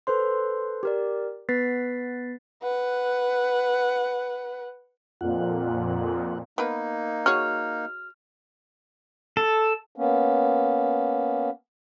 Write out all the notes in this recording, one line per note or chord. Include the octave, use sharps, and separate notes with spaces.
A4 B4 C5 C6
G4 A#4 D5
B3 B4 A6 B6 C7
B4 F#5
F2 A#2 F4 F#5
A#3 B3 D#4 A#4 B4
F#4 G#4 C#5 F6
A4
A#3 B3 C#4